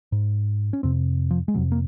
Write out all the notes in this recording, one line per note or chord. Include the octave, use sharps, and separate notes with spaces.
G#2
C#4
F2 C3 C4
F3
G#3
F2 C3 F#3
A#3